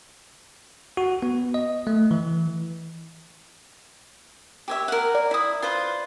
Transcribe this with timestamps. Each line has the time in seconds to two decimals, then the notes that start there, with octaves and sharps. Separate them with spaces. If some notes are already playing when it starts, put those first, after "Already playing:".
0.97 F#4
1.22 B3
1.54 D#5
1.87 A3
2.11 E3
4.68 G4 C#5 E5
4.88 A#4 F#5
5.15 D5
5.31 E4 D#6
5.62 F4 B4 C5